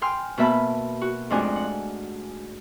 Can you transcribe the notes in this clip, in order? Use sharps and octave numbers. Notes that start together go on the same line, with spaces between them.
G5 G#5 C6 F6
B2 A#3 E5 A5 B5
F#4
F2 G#2 A3 D4 F#4 G#5
F#5